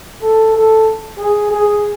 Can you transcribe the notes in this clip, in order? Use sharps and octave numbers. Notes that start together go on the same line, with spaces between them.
A4
A4
G#4
G#4